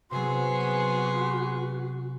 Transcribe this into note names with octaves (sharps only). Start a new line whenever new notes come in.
C3 F#3 B3 F#4 G#4 C6